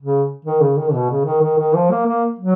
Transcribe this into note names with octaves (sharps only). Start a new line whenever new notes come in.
C#3
D#3
C#3
D#3
B2
C#3
D#3
D#3
D#3
F3
A#3
A#3
F#3